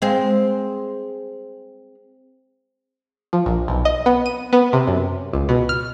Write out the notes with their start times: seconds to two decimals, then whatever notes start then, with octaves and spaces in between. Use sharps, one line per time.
0.02 G#3 C4
3.33 F3
3.46 A#1
3.68 B1
3.85 D#5
4.06 B3
4.26 D#7
4.53 B3
4.73 C3
4.88 F#2
5.33 C#2
5.49 B2
5.69 F6